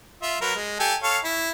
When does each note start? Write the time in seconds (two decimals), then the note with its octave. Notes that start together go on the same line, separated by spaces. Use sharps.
0.22 F4 E5
0.41 F#3 A#4 B4
0.55 G#3
0.80 G4 A4 G#5
1.03 A4 C#5 F5
1.24 E4